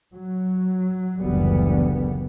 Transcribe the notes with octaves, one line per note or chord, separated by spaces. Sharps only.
F#3
F#1 D2 E3 G3 B3